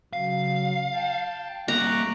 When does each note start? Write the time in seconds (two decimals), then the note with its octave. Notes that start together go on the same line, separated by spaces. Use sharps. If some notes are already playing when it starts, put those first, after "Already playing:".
0.13 C#3 F#3 F5
0.94 G5 A5
1.68 G3 A#3 A#5 C#6 D6 F#6